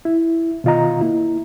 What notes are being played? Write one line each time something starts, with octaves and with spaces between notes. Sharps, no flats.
E4
B2 D#3 F4 D#5 A#5
A#3 E4